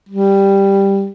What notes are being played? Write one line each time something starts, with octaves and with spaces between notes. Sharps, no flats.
G3